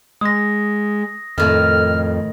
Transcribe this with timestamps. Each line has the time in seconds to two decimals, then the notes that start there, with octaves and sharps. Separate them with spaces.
0.21 G#3 D#6 A#6
1.38 F2 A2 D#3 F6